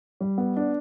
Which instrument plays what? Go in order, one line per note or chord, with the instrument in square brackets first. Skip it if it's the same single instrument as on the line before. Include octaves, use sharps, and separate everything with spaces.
[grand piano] G3
B3
D4